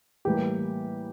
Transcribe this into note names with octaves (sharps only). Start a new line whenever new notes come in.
A2 E3 G3 A#3 G4